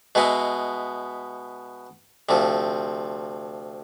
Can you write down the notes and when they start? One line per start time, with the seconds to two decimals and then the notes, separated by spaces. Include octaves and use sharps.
0.15 B2 G#3 B3 E4
2.29 D2 C3 F3